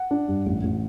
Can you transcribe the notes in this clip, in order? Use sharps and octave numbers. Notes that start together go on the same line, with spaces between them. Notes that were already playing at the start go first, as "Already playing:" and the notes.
Already playing: F#5
D4
G2
A1
A1